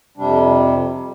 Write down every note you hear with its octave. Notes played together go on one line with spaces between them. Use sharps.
F2 C3 G3 D4